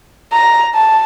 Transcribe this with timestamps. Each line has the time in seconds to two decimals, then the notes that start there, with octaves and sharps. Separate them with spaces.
0.33 A#5
0.75 A5